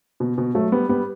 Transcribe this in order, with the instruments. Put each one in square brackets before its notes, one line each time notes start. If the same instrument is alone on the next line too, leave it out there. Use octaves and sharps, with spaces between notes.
[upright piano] B2
B2
F#3 A3
G3 B3
G3 B3